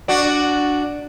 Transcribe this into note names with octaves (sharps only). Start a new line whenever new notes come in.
D4 F#4